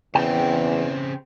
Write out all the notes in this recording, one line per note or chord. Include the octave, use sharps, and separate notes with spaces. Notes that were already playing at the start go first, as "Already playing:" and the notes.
E2 C#3 C4 G5